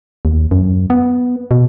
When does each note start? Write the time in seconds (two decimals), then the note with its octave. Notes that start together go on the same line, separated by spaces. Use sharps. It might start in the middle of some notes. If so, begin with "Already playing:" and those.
0.25 D#2
0.51 F#2
0.90 B3
1.51 B2